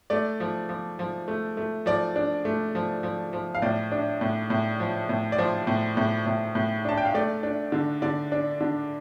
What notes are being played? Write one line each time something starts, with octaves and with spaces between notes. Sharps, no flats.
A3 D5
F3
F3
F3
A3
A3
F3 D5
D4
A3
F3
F3
F3
F5
A2 D5
D4
A2
A2
F3
A2
D5
F3 C5
A2
A2
A2
A2
D4 A5
G5
F5
A3 D5
D4
D3
D3 D5
D4
D3